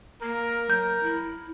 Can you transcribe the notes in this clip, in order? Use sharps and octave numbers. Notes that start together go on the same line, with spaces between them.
A#3 A#4
F#3 G6
E4